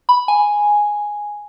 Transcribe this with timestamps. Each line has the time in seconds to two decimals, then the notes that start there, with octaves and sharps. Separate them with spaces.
0.09 B5
0.28 G#5